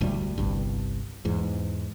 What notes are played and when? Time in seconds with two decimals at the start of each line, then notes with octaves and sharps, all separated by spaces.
0.01 F1 D2 A2 G3
0.38 G1 C2 G2
1.25 E2 G#2